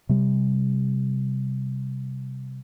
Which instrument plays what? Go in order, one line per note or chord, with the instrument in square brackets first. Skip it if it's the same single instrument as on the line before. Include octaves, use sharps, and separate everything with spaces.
[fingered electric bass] C3 G3